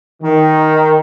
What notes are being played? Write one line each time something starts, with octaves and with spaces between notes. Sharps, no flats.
D#3